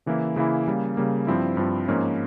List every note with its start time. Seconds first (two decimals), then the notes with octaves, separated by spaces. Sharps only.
0.06 C#3 E3 A#3 E4
0.36 C#3 E3 A#3 E4
0.68 C#3 G3 A#3
0.97 C#3 G3 A#3
1.27 G2 F3 C4 E4
1.57 G2 F3 C4 E4
1.88 G#2 F3 A#3 C#4